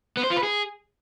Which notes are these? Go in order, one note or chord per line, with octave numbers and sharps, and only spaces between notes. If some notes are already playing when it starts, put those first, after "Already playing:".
B3
C5
F4
B4
G#4